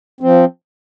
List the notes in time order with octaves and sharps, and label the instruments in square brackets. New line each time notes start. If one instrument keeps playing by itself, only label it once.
[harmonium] F3 C4